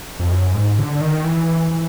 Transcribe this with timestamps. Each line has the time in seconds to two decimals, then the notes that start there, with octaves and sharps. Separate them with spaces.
0.20 F2
0.31 F#2
0.54 G#2
0.79 D3
1.01 D#3
1.24 E3
1.71 E3